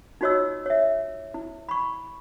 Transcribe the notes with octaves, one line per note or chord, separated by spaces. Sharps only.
D#4 F4 F#4 C#5 D#5 E6
C#5 E5
E4
B5 C#6